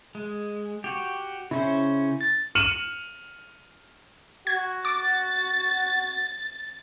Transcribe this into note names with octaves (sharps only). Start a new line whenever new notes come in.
G#3
F#4 G4
C#3 C#4 E4 C5
A6
F6 C#7 D#7 E7 F#7
F#4 G#6
D6 A6